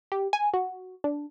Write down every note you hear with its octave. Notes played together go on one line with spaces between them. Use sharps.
G4
G#5
F#4
D4